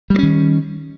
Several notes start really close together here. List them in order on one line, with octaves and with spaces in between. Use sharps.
G3 A3 C#4 D#3